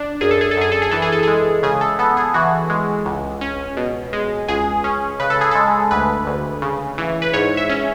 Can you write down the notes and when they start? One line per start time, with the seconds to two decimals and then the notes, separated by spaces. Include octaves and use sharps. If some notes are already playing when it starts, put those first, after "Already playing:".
Already playing: D4
0.21 F#2 G#4
0.31 A4
0.41 G#4
0.51 A4
0.57 F#2 G#4
0.72 A4
0.82 G#4
0.91 E3 A4
1.02 G#4
1.12 A4
1.23 G#3 G#4
1.63 C#3 G#4
1.81 A4
1.99 B3 A4
2.17 G#4
2.34 E3 F#4
2.70 G#3
3.06 C#2
3.41 C#4
3.77 B2
4.13 G#3
4.48 C#2 G#4
4.84 C#4
5.20 C#3 B4
5.30 A4
5.41 G#4
5.51 G#3 A4
5.91 D2 B4
6.27 D2
6.62 C#3
6.98 E3
7.22 B4
7.33 G#2 C#5
7.57 E5
7.69 C#4